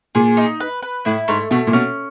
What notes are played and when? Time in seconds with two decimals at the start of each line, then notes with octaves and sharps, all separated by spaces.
0.15 A#2 G#4
0.37 D#4
0.60 B4
0.82 B4
1.05 A2 E4
1.28 G#2 A3
1.51 B2 A3
1.67 A#2
1.73 B2 C#4